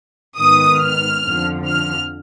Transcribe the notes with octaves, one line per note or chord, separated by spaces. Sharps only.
G#2 D#3 B3 D#6
F6
F2 D3 F3
F6